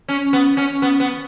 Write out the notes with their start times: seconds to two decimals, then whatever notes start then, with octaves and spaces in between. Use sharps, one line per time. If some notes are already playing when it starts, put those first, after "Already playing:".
0.09 C#4
0.33 B3
0.57 C#4
0.82 B3
1.00 B3